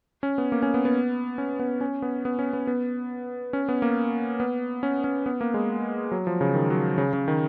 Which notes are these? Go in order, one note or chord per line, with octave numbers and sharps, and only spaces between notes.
C#4
B3
A#3
C#4
B3
B3
C#4
B3
C#4
B3
B3
C#4
B3
B3
C#4
B3
A#3
B3
C#4
C#4
B3
A#3
G#3
F#3
F3
C#3
D#3
F#3
C#3
C#3
D#3